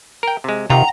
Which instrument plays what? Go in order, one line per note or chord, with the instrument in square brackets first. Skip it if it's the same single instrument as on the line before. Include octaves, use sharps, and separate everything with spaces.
[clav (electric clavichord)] A#4 G5
C3 G#3
[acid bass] C3 [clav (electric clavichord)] D#3 F4 [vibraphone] F#5 G5 [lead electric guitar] A#5